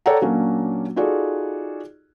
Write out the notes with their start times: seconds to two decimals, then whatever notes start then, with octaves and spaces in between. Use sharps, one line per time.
0.06 A4 C#5 D5 F#5 G5 A#5
0.22 A#2 F#3 A#3 C#4 D4
0.96 D#4 F4 F#4 G#4 A4 D5